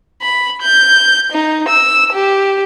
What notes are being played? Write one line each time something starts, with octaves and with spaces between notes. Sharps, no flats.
B5
G6
D#4
E6
G4